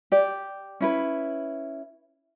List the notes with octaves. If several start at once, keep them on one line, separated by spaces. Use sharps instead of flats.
G4 D5
C#4 E4 B4